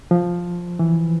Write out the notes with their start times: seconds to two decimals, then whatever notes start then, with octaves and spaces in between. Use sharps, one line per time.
0.11 F3
0.79 E3